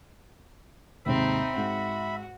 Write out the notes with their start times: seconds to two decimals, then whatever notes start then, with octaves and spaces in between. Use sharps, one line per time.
1.06 D#2 G#2 C3 C4 D#4 E5 B5
1.57 G#2 F#4